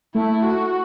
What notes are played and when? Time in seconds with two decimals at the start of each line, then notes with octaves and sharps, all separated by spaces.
0.15 A3 E4
0.43 F#4